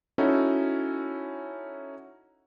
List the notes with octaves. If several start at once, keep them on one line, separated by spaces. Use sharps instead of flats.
C#4 D#4 E4 F#4 A4